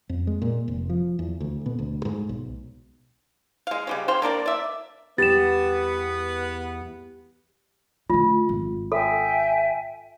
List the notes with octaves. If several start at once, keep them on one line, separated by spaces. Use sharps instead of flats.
F2
G#3
A#2
F1
F3
E2
D2
B2
D2
G#2
B1
G#3 F5
C#3 G3 C#4
C5 F5 G5
A#3 D4 A#4 D5
D5 E5
E2 B3 G4 A6 E7
D3 A3 F4
G#1
A4 E5 G5 G#5